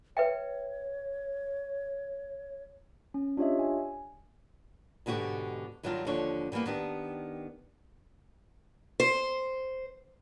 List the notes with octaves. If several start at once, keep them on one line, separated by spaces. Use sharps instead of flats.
B4 C#5 E5 G5
C#4
D4 F4 G4 C#5 D#5 E5
G#5
G#2 B2 D3 F#4 G4
G2 D#3 F#3 G3 D4 F4
D#2 D3 F3 D4 C#5
D3 E3 G3 A#3 B3
D#3 B3 D4 G4
C5